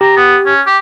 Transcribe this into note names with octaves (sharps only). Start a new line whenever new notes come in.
G4 A#5
B3
C#4
G4